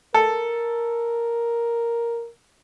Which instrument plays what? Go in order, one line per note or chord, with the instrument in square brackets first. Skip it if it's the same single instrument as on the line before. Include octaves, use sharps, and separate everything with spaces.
[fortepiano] A4 [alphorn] A#4